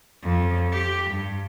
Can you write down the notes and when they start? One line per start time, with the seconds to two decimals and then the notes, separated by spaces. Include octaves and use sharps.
0.23 F2
0.72 G4
1.11 G2